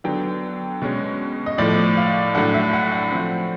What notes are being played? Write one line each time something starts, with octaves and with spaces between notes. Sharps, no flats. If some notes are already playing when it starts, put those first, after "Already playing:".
D3 F#3 B3 G5
B2 G#3 C#4
D#5
A2 F3 A3 D5
F5
A2 F#3 A3 D4 F#5
E5
F#5
F#5
F3 A3 C4